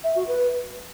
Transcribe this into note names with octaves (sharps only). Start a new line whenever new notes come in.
E5
F#4
B4